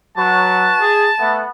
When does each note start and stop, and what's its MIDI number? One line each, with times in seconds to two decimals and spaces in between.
0.17 0.69 54
0.17 0.86 66
0.17 0.86 71
0.17 1.49 81
0.17 0.86 85
0.80 1.08 68
1.19 1.43 57
1.19 1.49 59